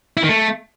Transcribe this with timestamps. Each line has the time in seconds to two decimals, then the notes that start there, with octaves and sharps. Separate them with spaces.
0.17 E4
0.23 D#3
0.29 A3